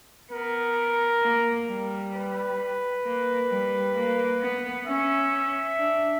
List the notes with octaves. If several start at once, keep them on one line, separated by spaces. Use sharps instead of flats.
B3 A#4
A#3
G3
B4
A#3
G3
A#3
B3
C#4 E5
D4